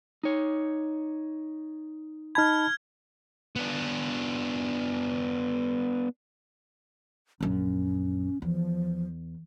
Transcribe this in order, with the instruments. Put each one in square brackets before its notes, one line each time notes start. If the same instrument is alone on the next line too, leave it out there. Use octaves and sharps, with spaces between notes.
[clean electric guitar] D#4 C#5
[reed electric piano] D#4 A5 B5 [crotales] F6 G#6
[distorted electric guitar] B3 D4
[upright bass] A#1 F#2 [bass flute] C#4
[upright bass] E2 [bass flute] F3